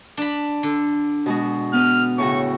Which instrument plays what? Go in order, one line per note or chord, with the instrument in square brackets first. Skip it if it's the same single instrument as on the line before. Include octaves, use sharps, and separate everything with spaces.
[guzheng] D4 B5
D3
[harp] B2 G#3 F#4
[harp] B3 B4 [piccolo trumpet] F6
[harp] A2 C#3 F#4 [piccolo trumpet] C#6